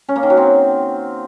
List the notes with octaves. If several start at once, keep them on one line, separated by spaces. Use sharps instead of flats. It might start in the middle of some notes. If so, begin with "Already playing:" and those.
C#4
A#3
D#3
F#3
C4